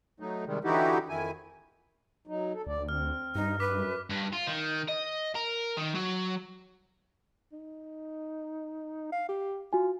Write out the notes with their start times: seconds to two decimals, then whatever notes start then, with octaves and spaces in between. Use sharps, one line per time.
0.20 F#3 A3 D#4
0.46 C3 D#3 G3 G#3
0.64 D3 E3 D#4 E4 F#4 G4
1.09 F2 D#3 E4 G#5
2.27 F#3 D#4
2.53 A4
2.67 D2 D5
2.89 C4 F6
3.35 G2 D#4
3.60 F#2 B4 D6 B6
4.10 G2
4.33 F4
4.47 D#3
4.89 D#5
5.35 A#4
5.77 D#3
5.95 F#3
7.53 D#4
9.12 F5
9.29 G4
9.73 F4 F#4 G#5